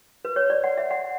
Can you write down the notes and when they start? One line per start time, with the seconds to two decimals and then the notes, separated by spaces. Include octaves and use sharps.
0.25 B4
0.36 C#5
0.50 D5
0.64 F#5
0.77 E5
0.91 F#5